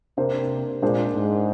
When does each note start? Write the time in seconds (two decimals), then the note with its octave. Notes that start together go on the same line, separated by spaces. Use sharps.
0.17 C3 A#3 D4 G4 C5
0.82 A#2 G#3 D4 G#4 C5
1.15 G#2